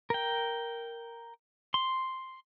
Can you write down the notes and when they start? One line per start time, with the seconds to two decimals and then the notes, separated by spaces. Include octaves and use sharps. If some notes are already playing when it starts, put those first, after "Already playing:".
0.10 A#4 G5
1.74 C6